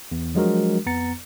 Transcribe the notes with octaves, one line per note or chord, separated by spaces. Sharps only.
E2
F3 F#3 G#3 D4 F#4 A#4
F2 B3 A#5 A6 C#7